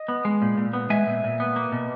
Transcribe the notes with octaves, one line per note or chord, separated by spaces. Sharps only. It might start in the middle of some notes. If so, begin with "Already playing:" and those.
Already playing: D#5
B3
G#3
A#2
A#2
B3
G#3 E5 G#5
A#2
A#2
B3
A#3
B2